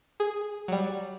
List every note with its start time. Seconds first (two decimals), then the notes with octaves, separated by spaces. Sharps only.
0.20 G#4
0.68 F#3 G3